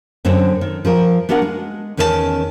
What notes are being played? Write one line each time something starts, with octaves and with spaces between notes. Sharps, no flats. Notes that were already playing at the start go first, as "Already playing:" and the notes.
F#2 D3 C4 C5 C#5
D#3
F3 F4 A#4
B3 D4 F#4 A#4 E5 F#5
G#3
E2 D#3 C#4 A#4 B4 A5